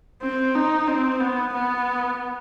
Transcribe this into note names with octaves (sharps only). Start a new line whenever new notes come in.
C4
D#4
C4
B3
B3